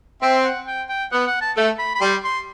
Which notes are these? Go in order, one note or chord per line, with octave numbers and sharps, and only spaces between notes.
C4 E5
F#5
G5
G5
B3 F#5
F#5
A5
A3
B5
B5
G3 C6
C6